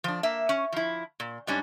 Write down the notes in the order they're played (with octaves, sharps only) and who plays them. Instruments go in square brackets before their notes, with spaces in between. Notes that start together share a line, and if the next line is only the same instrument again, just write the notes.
[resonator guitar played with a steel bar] F3 D4
A#3 E5
C#4
F3 E4
A#2
G#2 G3 C#4 D4